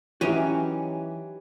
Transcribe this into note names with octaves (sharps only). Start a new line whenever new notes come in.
E3 F#3 C#4 D#4 F#4 G4 E5